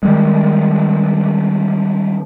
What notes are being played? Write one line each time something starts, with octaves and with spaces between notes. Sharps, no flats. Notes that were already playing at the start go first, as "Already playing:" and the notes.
D#3 G3 G#3